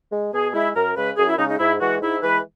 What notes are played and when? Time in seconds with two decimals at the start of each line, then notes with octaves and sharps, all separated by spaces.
0.12 G#3
0.33 B2 G#4
0.54 G#3 E4
0.75 F#2 A#4
0.96 C#3 G#3 B4
1.17 F#2 G#4
1.29 E4
1.38 C#3 G#3 D#4
1.49 D#4
1.59 G#2 E4
1.80 E3 G#3 F#4
2.02 G#2 E4
2.22 E3 G#3 B4